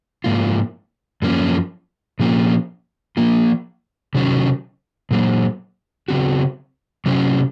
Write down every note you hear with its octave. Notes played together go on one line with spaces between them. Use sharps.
G#2 F3 A#3 F4
F#2 F3 A#3 C#4
A#2 F3 A#3 C#4 F4
F3 A#3 F4
C3 D#3 F#3 C#4
A#2 F#3 A#3
C#3 F#3 C4 F#4
C3 F#3 C#4 F#4